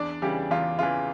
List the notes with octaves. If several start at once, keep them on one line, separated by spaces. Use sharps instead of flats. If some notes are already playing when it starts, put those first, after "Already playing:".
Already playing: E2 D4 D5
C#3 E3 G3 G4
E2 F4
C#3 E3 F4